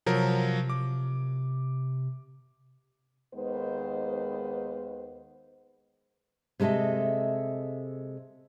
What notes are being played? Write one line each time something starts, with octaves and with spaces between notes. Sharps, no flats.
C3 F3 F#3 A#4
D6
D#2 D#3 G#3 B3 B4 C5
C3 G#3 A4 D#5 E5